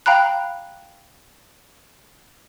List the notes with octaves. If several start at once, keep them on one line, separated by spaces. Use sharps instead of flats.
F5 G5 A#5 B5 F#6